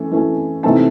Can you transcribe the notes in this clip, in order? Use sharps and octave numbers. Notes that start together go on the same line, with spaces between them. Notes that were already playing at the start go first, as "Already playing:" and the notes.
Already playing: E3 A3 C#4
E3 A3 C#4
C3 E3 A3 C4 D#4 A5